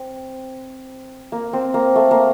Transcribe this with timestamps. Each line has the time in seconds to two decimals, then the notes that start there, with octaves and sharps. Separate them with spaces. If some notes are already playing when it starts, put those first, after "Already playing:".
Already playing: C4
1.32 A#3
1.53 C4
1.74 A#3
1.96 A3
2.11 A#3